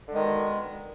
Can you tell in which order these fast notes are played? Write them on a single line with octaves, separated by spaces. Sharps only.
D3 G#3 D#3 B2